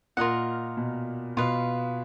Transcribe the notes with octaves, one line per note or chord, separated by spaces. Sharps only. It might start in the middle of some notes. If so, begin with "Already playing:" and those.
A#2 F4 A#4 D#5 F#5
B2
B2 F4 B4 F5